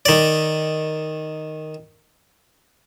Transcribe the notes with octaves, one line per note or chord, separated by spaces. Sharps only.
D#3 D5